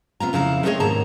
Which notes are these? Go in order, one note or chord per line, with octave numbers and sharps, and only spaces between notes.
C3 B3 F4 A#5
F2 C#3 E4 F5 A#5
G#3 A3 C4 G#4 C#5 D#5
D#2 G#2 B2 A5 A#5